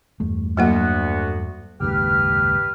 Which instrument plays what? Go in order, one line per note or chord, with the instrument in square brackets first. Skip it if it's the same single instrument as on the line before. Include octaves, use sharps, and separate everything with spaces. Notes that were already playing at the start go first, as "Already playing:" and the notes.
[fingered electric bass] E2 G2 A3
[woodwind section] D2 B3 F#4 [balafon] F#3 A#3 F#5
[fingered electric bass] F#1 D#2 G#2 [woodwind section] G4 B4 F6